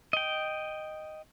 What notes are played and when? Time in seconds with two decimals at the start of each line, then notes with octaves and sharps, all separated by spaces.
0.13 D#5 G5